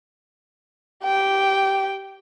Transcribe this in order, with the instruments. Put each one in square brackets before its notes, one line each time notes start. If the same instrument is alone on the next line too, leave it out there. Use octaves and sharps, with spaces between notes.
[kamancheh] G4 G5